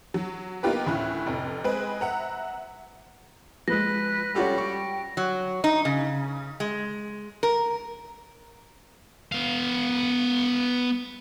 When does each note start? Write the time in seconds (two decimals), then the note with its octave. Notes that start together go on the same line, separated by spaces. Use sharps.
0.14 F#3
0.63 A#3 B3 D#4 F4 G4 B4
0.86 D2 A2 C#4 E4 F#6
1.26 F1 F2
1.64 G#3 C4 G#4 B4 D#5
2.01 E5 F#5 A#5
3.68 F3 G#3 B4 A#6
4.35 G3 C#4 F4 F#4 A4
4.58 G5 C#6
5.17 F#3
5.64 D#4
5.85 C#3
6.60 G#3
7.43 A#4
9.32 B3 F5